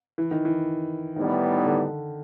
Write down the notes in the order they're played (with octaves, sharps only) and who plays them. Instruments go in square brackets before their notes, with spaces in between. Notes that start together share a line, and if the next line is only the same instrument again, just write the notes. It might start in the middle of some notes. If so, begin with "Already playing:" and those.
[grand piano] E3
D#3
E3
[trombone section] A2 E3 G3 B3 D#4 [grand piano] D#3
[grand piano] D3